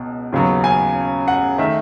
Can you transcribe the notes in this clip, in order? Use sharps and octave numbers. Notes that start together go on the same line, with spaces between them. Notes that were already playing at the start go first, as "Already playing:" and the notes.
Already playing: C#2 B2
D#2 C#3 F#3 B3
G#5
F#5
D#3 A3 E5